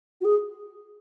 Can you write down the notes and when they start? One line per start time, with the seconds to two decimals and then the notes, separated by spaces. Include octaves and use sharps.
0.21 F#4
0.25 G#4